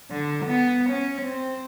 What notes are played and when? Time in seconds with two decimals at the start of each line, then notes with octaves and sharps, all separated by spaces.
0.11 D3
0.46 B3
0.90 C#4
1.22 C4